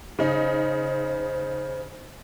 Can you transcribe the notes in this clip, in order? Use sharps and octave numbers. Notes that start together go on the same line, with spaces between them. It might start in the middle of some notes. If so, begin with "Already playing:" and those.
C#3 D#4 C5